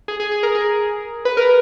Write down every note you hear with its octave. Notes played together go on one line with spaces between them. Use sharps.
G#4
G#4
G#4
A#4
G#4
B4
A#4